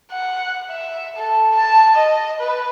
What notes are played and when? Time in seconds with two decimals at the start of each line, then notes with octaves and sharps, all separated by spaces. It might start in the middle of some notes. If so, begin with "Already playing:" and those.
0.12 F#5
0.70 E5
1.16 A4
1.55 A5
1.96 D#5
2.40 B4